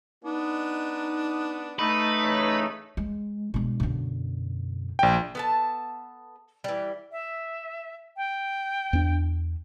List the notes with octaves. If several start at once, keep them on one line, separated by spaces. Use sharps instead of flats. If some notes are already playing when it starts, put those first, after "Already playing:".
B3 D4 D#4
A3 D#4 B4
A1 C#3 C#5
G#3
B2 G#3 D4
F#2 D3
A#1 G5
B3 A4 A5
E3 G3
E5
G5
E2 D4